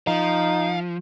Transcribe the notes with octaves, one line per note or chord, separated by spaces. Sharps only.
F3 D#4 F5